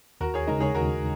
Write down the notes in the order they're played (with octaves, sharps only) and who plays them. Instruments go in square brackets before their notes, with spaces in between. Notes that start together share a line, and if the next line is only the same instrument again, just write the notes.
[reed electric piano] D#2 [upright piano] F#4 A#4
[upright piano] G#4 C#5
[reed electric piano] C#3 G#3 D#4 [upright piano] A#4 D#5
[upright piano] G#4 C#5
[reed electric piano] D#2 [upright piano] F#4 A#4